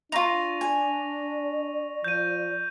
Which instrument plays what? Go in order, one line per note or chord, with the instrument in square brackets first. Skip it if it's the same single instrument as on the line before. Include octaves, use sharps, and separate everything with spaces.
[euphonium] D4 [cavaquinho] D#4 F4 [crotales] C#6 A#6 F7
[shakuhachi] D5 [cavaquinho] G#5
[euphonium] F3 [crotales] G6 D#7